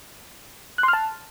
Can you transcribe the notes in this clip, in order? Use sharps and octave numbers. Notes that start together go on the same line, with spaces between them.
F#6
C6
F6
A5